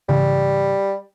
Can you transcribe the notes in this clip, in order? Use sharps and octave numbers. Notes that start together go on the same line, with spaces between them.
G#2 C#3 E3 G3